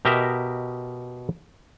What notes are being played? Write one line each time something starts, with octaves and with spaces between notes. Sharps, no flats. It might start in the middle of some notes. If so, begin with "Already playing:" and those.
B2 G4 A#4 D#5 E5 A#5